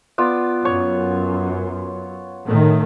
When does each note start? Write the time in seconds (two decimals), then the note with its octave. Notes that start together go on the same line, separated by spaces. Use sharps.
0.18 B3 F4 D5
0.65 F#2 C#5
2.45 A2 D#3 A3